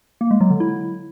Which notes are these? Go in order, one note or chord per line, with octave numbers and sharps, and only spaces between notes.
A#3
G#3
F#3
D3
E4